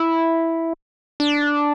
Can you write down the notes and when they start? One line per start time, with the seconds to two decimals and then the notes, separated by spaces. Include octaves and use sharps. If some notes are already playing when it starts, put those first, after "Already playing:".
Already playing: E4
1.20 D4